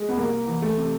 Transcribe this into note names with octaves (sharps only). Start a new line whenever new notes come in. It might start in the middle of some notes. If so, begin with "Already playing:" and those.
Already playing: G#3
B3
C2 A#3
E3
A3
C3